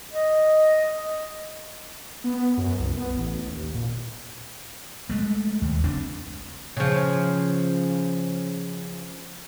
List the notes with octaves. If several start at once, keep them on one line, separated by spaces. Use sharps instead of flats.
D#5
B3
F#2
C2
B3
A1
D#2
A#2
G#3 A3
D#2
F#1 C4 D4
C#3 F3